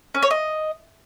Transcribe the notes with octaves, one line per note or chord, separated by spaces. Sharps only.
C#4
C#5
D#5